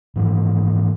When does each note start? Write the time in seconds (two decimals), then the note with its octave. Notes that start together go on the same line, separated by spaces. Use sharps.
0.16 G#2 E3 F3